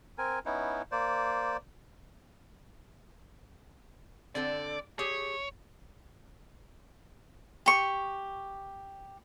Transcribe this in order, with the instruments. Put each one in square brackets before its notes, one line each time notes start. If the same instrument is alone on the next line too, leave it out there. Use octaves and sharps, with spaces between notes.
[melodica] C4 A#4 G#5
B3 C#4 D#4 E4
A#3 C5 D5
[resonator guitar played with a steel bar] D3 C4 A4 [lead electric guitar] D5
[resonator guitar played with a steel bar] G4 G#4 [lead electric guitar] C#5
[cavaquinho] G4 C#6